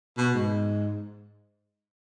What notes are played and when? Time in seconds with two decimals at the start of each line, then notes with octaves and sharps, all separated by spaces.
0.18 B2
0.34 G#2